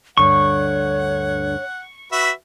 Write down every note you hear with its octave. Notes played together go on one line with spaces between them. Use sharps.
D2 G2 D3 C#5 F#5 C#6
F#4 B4 E5